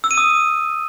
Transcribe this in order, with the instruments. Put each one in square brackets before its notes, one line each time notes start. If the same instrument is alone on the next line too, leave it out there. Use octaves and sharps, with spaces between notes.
[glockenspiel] E6
D#7
D#6